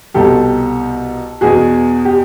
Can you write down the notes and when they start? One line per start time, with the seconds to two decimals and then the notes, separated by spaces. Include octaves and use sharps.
0.14 C2 B2 G4 A4
1.41 E2 B2 F#4 G#4
2.05 G4